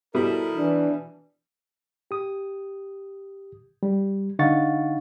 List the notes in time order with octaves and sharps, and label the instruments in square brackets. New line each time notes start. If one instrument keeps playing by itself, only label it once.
[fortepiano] B2 G3 B3 [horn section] E4 A#4 [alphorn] A4
[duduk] E3 [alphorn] D4
[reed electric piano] G4 D#6
G3
D3 D#4 F5 F#5 C#6 A6